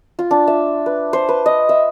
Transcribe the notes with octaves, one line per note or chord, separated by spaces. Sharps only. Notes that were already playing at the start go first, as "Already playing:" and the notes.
F4
D4
E5
B4
C5
B4
D#5
E5